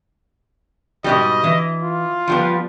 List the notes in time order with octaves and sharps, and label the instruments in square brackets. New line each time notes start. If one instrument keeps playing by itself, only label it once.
[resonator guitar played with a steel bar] G#2 B2 G3 [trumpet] D#5
[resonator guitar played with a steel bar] E3
[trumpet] F4
[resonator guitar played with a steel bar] F3 G3 B3